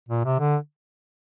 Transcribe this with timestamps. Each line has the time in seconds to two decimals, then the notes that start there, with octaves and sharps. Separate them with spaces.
0.08 A#2
0.25 C3
0.39 D3